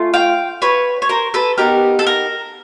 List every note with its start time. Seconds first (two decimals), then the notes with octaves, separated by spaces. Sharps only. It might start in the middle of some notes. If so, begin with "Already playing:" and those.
Already playing: A3 C#4 F4
0.14 F5 G5
0.62 B4 C#5
1.02 C#5
1.09 A#4 C5
1.34 A4 B4
1.58 B3 D#4 G4 A#4
1.99 A4
2.07 A#4